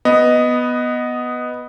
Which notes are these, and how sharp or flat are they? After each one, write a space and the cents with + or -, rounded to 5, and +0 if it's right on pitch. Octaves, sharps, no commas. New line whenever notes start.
B3 +0 D#5 +0